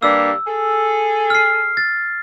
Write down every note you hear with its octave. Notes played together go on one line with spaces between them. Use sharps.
G2 G3 A#3 E6
G#4 A4
F6 C7
A6